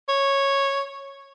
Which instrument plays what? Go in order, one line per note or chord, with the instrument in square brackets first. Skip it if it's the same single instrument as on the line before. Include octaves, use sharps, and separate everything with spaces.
[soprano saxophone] C#5